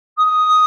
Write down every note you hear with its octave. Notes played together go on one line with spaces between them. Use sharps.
D#6